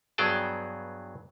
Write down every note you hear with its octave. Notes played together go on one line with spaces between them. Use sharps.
G2 F#3 B3 G#4 G5 A5